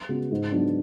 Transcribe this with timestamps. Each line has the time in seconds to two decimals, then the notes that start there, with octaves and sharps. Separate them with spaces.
0.09 C#3 G#3 B3 F#4
0.31 G#2
0.52 F#3 B3 D4